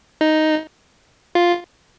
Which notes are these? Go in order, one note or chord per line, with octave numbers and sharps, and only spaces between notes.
D#4
F4